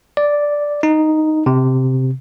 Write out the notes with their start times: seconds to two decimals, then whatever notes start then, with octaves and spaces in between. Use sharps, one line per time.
0.17 D5
0.83 D#4
1.46 C3